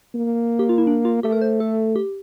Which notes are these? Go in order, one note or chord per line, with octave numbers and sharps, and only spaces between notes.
A#3
G4
F4
E4
D4
F4
A3 G4
A#4
C5
A4
G4